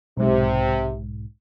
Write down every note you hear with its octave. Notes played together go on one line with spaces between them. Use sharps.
B1 G#2 C3